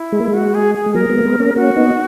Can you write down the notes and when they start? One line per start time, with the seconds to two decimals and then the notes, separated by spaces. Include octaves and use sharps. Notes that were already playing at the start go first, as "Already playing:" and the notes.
Already playing: E4
0.12 G#3
0.21 A#3
0.27 G#3
0.33 F#4
0.54 G#4
0.75 G#4
0.86 G#3
0.94 F#3 A#3 A#4
1.10 G#3 B3
1.18 A#3
1.25 G#3 B3
1.40 A#3 C#4
1.56 A#3 C#4 F#4
1.76 B3 D#4